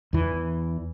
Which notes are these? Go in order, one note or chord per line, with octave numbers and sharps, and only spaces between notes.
E2 E3